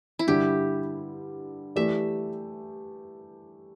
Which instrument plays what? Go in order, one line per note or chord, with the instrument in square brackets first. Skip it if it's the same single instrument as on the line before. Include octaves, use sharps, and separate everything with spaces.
[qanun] E4
[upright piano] G2 D3 G3 [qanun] G4
[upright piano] E3 A3 G4 D5 [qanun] E5